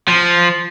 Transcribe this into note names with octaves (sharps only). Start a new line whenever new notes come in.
F3